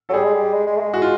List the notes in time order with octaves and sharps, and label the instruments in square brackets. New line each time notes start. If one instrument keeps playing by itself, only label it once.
[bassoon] F#3 [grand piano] A4
[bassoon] G3 [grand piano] G#4
[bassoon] G#3
G3
G#3
G#3
A3
G#3
[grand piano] F#4
F4